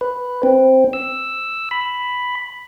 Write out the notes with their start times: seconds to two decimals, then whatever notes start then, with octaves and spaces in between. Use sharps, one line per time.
0.01 B4
0.43 C4
0.93 E6
1.71 B5